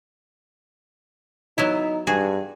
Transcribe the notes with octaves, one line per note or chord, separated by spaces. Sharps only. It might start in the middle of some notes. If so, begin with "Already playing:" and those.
F#3 B3 D#4 E4
G2 F#4 G#4